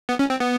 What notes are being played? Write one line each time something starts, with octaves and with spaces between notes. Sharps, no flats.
B3
C#4
C4
B3